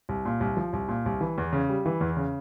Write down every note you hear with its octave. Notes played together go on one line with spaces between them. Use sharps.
C2
A#2
C2
F3
C2
A#2
C2
E3
E2
C#3
G3
E3
E2
C#3